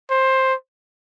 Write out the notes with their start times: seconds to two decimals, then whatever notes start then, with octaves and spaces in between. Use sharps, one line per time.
0.10 C5